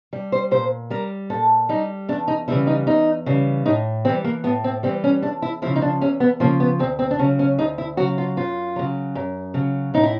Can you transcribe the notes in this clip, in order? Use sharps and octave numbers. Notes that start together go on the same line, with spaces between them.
G3
C5
A#2 C5
G3 A#4
A#2 A4
G3 D#4
E2 D4
D#4
C#3 E3 G3 E4
D#4
E2 D#4
C#3 E3 G3
A2 D#4
E3 G3 C4
A#3
A2 B3
C4
E3 G3 C4
C#4
E2 D4
E4
C#3 F3 E4
D#4
D4
E2 C#4
B3
C#3 F3 A#3
B3
D2 C4
C4
D4
C#3 F#3 C#4
C#4
D2 D#4
E4
C#3 F#3 F#4
F4
F#2 F4
C#3 F#3
F#2
C#3 F#3
A2 D#4
E4